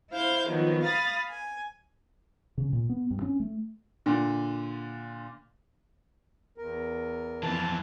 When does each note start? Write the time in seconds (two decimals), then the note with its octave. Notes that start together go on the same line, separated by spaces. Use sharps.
0.11 E4 C5 F5 G6
0.49 D#3 F3 F#3 B3
0.83 F5 B5 D#6 A6
1.30 G#5
2.58 C#3
2.73 A#2
2.89 B3
3.11 G2
3.22 C#4
3.40 A3
4.06 A#2 D3
6.58 E2 A#4
7.43 F2 E3 A5